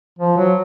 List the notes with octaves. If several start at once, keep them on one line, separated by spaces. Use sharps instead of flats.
F3
F#3